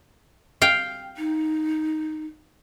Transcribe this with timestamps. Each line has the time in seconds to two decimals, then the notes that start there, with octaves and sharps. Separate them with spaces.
0.62 F5 G5
1.17 D#4